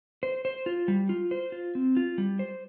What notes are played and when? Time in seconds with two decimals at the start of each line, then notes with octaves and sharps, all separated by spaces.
0.23 C5
0.45 C5
0.66 F4
0.88 G3
1.09 F4
1.31 C5
1.52 F4
1.75 C4
1.97 F4
2.18 G3
2.39 C5